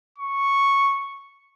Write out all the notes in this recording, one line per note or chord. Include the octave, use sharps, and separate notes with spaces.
C#6